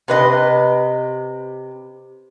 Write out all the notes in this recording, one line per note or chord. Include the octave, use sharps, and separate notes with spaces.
C3 B4 D#5